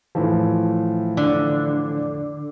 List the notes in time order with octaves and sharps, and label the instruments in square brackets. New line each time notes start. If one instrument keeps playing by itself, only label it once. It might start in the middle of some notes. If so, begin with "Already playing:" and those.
[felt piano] A2 E3 F3
[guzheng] D3